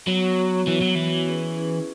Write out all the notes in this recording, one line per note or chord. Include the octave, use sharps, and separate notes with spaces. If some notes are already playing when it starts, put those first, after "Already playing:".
F#3 B3 F#4 C#5
B3 F#4 C#5
E3 B3 F#4 C#5
F#3
E3 B3 F#4 C#5
C#4 E4 G#4 B4
C#4 E4 G#4 B4